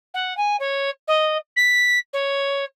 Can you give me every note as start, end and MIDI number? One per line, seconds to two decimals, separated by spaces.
0.14 0.36 78
0.37 0.56 80
0.60 0.90 73
1.08 1.37 75
1.56 1.99 95
2.13 2.64 73